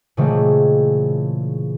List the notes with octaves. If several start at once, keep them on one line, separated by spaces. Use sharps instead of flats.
A#2 C#3 E3 G#3 A3 C4